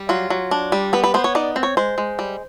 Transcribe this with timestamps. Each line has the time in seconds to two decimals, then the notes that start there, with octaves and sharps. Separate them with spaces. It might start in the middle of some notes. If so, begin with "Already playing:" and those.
Already playing: G3
0.09 F#3 F4
0.30 F#3
0.51 D4
0.72 G3
0.93 B3 B4
1.04 B4
1.14 B3 C5
1.24 C#5
1.35 D#4 D5
1.56 C4
1.63 C#5
1.77 G#3 C5
1.98 G#3
2.19 G3